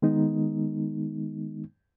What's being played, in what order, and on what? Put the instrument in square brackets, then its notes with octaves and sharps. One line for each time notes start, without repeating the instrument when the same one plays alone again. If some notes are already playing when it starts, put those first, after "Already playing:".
[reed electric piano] D#3 G#3 B3 D#4